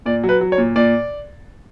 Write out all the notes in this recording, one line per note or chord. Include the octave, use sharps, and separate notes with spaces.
A#2 D5
F#3
B4
F#3
C#5
A#2
A#2 D5